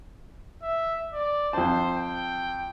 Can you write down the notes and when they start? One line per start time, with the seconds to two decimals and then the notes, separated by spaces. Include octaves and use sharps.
0.62 E5
1.13 D5
1.53 F2 C5 A5
1.97 G5